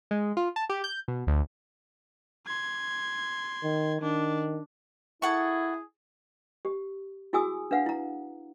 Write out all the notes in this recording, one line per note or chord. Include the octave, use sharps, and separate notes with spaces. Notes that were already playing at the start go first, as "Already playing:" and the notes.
G#3
F4
A5
G4
G6
B2
D2
C6 G#6
D#3
D#3 D4
E4 G#4 A4 F#5 C#6
G4
E4 F#4 G#4 G#5 D#6 E6
D4 B4 F5 F#5
E4 A#5